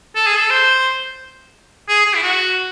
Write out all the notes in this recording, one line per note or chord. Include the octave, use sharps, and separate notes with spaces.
A4
G#4
A4
C5
G#4
G#4
E4
F#4